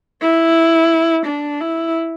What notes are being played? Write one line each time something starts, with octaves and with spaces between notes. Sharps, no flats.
E4
D4
E4